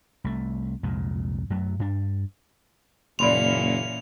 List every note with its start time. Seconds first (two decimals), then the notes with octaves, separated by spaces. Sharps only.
0.24 C2 A3
0.83 C2 F2 A#2 G#3
1.50 F#2 F#3 A3
1.80 G2 D4
3.19 F#1 A#2 E3 C#4 D5 B5 C6 F7